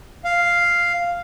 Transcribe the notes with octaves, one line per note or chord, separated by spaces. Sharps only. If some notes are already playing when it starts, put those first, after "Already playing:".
F5